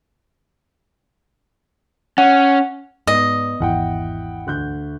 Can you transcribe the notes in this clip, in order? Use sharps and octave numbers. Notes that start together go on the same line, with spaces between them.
C#4 F#5
G#2 B3 D5 D#5
G#1 E2 E4 F#5 G5
D2 F#6 G6